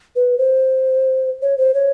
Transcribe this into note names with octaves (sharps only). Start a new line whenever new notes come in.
B4
C5
C#5
C5
C#5